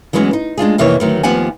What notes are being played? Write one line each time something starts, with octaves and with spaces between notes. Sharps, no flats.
E3 F#3 G#3 B3 C#4
D#4
G#3 D4 F4 G#4
F2 C3 E3 A#3 D#4 C#5
D2 D#3 F#3
D#2 F3 B3 G4 F#5 G#5